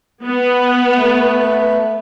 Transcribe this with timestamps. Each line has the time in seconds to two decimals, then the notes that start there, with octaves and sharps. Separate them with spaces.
0.25 B3
0.96 A3 B4